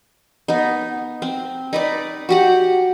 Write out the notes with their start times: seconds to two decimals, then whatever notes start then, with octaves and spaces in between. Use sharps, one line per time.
0.48 B3 D#4
1.22 C4
1.73 D#4 B4 D5
2.29 F#4 G4 F#5